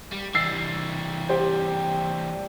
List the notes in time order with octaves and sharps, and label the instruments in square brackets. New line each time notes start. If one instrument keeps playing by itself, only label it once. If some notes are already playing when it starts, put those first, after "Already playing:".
[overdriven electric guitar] G3
[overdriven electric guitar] E3 G3 [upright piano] E6 A6 C7
[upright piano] G4 C5 G5